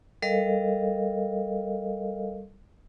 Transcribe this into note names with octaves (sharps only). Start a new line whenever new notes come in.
G3 A4 A#4 D#5 F5